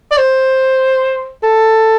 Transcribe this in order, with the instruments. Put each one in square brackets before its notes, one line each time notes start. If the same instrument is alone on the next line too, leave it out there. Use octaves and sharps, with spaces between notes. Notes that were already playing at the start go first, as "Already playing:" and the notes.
[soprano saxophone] D5
C5
A4